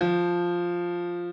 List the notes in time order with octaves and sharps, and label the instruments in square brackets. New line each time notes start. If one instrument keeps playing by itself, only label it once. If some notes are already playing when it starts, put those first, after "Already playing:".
[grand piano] F3